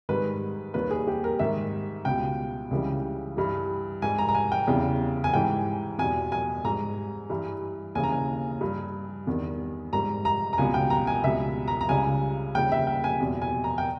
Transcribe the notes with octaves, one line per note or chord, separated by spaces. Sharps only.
G#2 D#3 G3 B4
D#2 D#3 G3 B4
G#4
G4
A#4
G#2 D#3 G3 E5
C#2 B2 G3 G5
C#2 C#3 E3 G3
G2 E3 G3
G#2 G3 G#5
A#5
A#5
G#5
G5
E2 C#3 E3 G3
G#5
G#2 E3 G3 G5
E2 B2 G3 G#5
G#5
G#2 G3 A#5
G2 E3 G3
D#2 C#3 E3 G#5
A#5
G#5
G2 G3
E2 D#3 G3
G#2 G3 A#5
A#5
A#5
C#2 B2 G3 G#5
G5
A#5
G#5
C#2 B2 G3 E5
A#5
A#5
C#2 C#3 G3 G#5
D#2 C#3 G3 G5
E5
G5
G#5
E2 B2 G3
G#5
A#5
G5